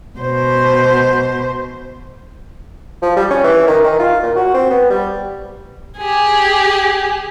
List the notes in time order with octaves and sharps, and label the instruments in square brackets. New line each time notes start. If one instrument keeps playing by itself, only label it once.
[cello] B2 C5
[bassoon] F3
G3
C#4
E3
D#3
D#3
F4
A#2
F#4
C4
B3
G3
[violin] G4 G#4